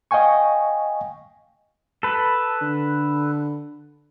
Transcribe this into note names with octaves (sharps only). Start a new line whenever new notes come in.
D#5 F5 G5 G#5 C#6
A4 B4
D3